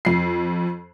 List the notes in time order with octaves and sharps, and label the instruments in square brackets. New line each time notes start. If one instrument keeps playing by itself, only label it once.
[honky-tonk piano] F2 C7